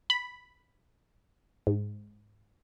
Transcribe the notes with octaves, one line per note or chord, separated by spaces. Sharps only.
B5
G#2